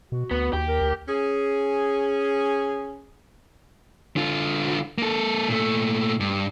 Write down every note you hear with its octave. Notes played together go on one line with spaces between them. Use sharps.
B2 F#4
D2 B3
D#2 G4
A#4
D2
C#4 G#4
D3 F4
A#3 A4
A#2 A3
G2